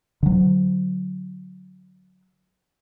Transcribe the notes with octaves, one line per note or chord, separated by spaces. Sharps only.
D3 F#3